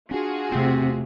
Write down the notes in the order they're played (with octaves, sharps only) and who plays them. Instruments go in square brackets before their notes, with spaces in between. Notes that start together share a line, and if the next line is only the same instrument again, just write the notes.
[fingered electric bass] C#4 D4 [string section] F4 F#4 G#4
[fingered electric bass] E1 A3 [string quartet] C3 [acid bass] C4